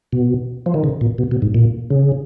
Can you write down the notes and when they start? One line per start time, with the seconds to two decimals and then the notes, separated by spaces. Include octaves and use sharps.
0.13 B2
0.66 F3
0.74 D#3
0.84 C#3
1.01 A#2
1.18 B2
1.31 B2
1.42 G#2
1.55 A#2
1.90 C#3